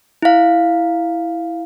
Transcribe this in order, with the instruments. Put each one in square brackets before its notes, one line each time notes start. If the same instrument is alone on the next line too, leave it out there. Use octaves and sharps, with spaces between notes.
[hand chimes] E4 F5